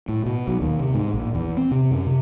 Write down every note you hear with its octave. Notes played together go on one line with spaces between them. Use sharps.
A2
B2
B1
D#2
C3
G#2
A#1
E2
C4
C3
F#2
C3